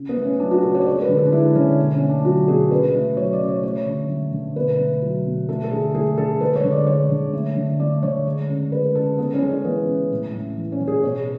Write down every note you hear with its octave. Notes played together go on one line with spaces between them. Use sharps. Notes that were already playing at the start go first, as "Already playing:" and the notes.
Already playing: C#3
B3
A3
C#4
F#3 D4
F#4
C#3 A4
C#5
D5
G#3 C#5
B4
D3
A4
D4
G#3 E4
D3 C#4
B2
C#4
A3
D4
F#3 F#4
B2 G#4
C#3 B4
A3
F#3 C#5
D5
C#3
C#5
A3 C#5
D3
A3
D3
B2 B4
A3
F#3
B2
A3 A4
A4
D3 G#4
A3 G#4
D3 A4
G#3 B4
C#5
D3
D5
G#3 C#5
D3
A3
D3
A3 D5
D3 C#5
G#3
C#3
G#3 B4
C#3 A4
C#3 B3
C#4
G#3
C#4
E3 B3
C#3
A2
A3
E3
C#4
A2
G#4
B2 C#5